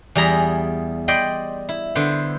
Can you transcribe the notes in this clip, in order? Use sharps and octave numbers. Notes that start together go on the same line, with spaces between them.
E2 G3 G#4 A#5 B5
D5 D#5 G5 B5 C6
E4
D3 B3 C5